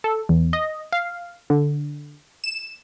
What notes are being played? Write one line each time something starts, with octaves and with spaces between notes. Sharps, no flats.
A4
E2
D#5
F5
D3
E7